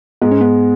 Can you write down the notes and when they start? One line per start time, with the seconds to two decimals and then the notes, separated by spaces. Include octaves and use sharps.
0.22 G#2 G#3 B3
0.31 C#4
0.41 B3